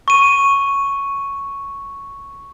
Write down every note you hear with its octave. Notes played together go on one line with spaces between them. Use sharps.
C#6 D#7